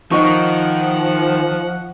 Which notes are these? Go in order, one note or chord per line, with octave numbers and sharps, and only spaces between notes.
D#3 F3 D#4 F#5 C#6